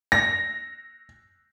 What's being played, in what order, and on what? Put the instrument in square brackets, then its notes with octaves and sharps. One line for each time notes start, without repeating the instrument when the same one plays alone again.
[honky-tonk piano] A#6